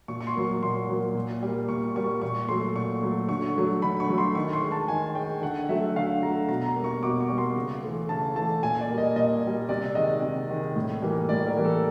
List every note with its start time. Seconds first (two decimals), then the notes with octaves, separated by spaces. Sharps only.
0.08 A#2 C#6
0.21 C#6
0.27 C6
0.36 F#3 A#3
0.44 C#6
0.63 A#2 C6
0.89 F#3 A#3
1.15 A#2
1.43 G3 A#3
1.69 A#2 C#6
1.96 G3 A#3 C#6
2.22 A#2 C#6
2.48 F#3 A3 C6
2.76 A#2 C#6
3.03 F#3 A3
3.29 D3 C#6
3.56 F#3 A3
3.82 D3 B5
4.00 C#6
4.09 F#3 A3
4.18 C6
4.35 D#3 C#6
4.53 C6
4.62 G#3
4.72 A5
4.88 D#3 G#5
5.15 G#3 G5
5.42 D3 F#5
5.69 F#3 A3 E5
5.96 D3 F5
6.23 F#3 A3 A#5
6.48 B2 A#5
6.66 A#5
6.75 G3 A#3
6.84 C#6
7.03 B2 D6
7.21 C#6
7.30 G3 A#3
7.38 C6
7.56 C#3
7.83 E3 A3
8.09 C#3 A5
8.35 E3 A3 A5
8.62 A#2 G#5
8.80 D5
8.90 G3 A#3
8.98 D#5
9.16 A#2 D#5
9.43 G3 A#3
9.69 C3 D5
9.95 D#3 G#3 D#5
10.22 C3
10.49 D#3 G#3
10.76 A2
11.02 E3 G3 A#3
11.29 A2 D5
11.47 A#4
11.56 E3 G3 A#3
11.65 A4